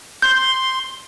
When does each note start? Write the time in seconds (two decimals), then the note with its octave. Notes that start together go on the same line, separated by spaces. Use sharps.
0.22 C6 G6